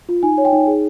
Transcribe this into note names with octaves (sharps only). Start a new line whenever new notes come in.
F4
D#4 G#5
C#5
G5
D#4
G#4